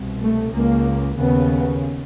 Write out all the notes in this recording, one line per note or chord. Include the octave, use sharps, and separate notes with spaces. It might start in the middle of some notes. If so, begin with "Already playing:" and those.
Already playing: C2 B2
A3
C#2 C#3 A#3
D#2 C#3 B3